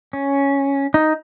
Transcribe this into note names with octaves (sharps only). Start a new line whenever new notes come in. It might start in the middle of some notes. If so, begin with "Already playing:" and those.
C#4
D#4